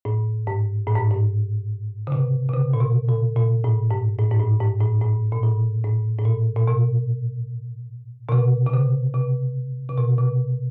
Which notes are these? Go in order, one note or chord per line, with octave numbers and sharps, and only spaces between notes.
A2
G#2
A2
G#2
G#2
C#3
C3
C3
C#3
A#2
B2
A#2
A#2
A2
G#2
A2
G#2
A2
G#2
A2
A2
A#2
A2
A2
A2
A#2
A#2
B2
B2
C3
C3
C#3
C3
C3
B2
C3